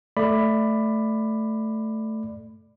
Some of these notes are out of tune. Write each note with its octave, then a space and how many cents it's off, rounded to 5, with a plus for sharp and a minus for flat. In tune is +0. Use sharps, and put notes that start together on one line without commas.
A3 +0 D5 +10 B5 +10